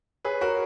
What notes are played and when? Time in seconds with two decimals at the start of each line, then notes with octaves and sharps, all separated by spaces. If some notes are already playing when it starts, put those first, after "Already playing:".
0.25 G#4 B4 C#5
0.41 F#4 A#4 C#5